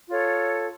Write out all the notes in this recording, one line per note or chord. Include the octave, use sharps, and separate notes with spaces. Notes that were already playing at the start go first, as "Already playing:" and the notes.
F4 A4 C#5